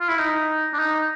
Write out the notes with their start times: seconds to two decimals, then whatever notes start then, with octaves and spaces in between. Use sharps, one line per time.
0.01 F4
0.09 E4
0.18 D#4
0.73 D4
0.79 D#4